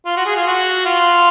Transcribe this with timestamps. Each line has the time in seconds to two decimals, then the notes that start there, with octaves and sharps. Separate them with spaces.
0.06 F4
0.17 F#4
0.26 G#4
0.36 F4
0.47 F#4
0.85 F4